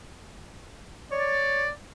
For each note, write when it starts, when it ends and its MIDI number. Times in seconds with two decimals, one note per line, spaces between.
1.12 1.65 73
1.12 1.71 74